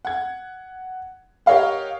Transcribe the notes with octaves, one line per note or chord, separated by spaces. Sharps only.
F#5 G#6
G4 A#4 C#5 D#5 F5 F#5